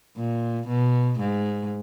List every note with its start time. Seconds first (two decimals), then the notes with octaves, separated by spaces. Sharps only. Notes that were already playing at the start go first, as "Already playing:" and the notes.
0.16 A#2
0.68 B2
1.20 G#2